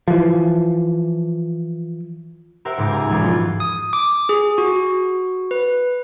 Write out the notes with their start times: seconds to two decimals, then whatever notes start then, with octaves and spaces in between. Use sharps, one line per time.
0.08 E3 F3
2.65 G4 A#4 C5 E5 F#5
2.78 C#2 G#2 G#5 D6
2.91 A#4 G#5 A#5
3.08 E1 G#3 G#6
3.22 F3 B3 F4
3.60 D#6
3.93 D6
4.29 G#4
4.58 F#4
5.51 B4